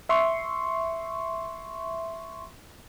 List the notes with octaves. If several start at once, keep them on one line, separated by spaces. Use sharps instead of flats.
E5 C6 C#6